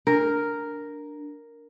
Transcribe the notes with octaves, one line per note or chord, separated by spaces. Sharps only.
D4 A#4